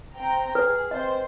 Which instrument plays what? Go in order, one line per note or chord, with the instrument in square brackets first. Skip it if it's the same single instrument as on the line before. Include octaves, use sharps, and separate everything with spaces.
[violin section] C4 G5 A#5
[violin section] G#4 [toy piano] B4
[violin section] C4 C5 [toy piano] D#5